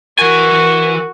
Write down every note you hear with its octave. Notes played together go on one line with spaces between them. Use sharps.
E3 F#4 A#4 G#5